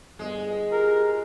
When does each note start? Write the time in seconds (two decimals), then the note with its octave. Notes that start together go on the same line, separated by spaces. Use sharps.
0.19 G1 G#3
0.72 F4 G4 G#4 A#4